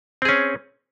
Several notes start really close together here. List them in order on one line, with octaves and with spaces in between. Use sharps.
C4 G#4 C#4